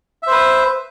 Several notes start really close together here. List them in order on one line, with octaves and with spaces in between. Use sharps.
E5 C5 B4